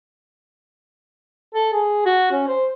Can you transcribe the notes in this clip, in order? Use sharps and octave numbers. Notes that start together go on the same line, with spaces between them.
A4
G#4
F#4
C#4
C5